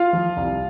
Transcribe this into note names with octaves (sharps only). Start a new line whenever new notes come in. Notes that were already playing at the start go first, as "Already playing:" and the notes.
Already playing: F4 F5
F3
C2